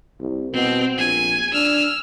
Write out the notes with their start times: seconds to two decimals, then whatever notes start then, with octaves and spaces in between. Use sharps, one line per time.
0.20 C2
0.54 B2 C4
0.98 A#1 G#5
1.53 D4 E6 F6